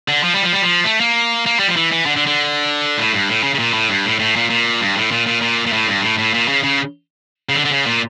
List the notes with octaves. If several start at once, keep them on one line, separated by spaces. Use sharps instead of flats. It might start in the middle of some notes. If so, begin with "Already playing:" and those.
D3
F3
G3
F3
G3
F3
A3
A#3
A#3
G3
F3
E3
E3
D3
D3
D3
A2
G2
A2
C#3
C#3
A#2
A2
G2
A2
A2
A#2
A#2
G2
A2
A#2
A#2
A#2
A#2
A2
G2
A2
A2
A#2
C#3
C#3
C#3
D3
D3
C#3
A#2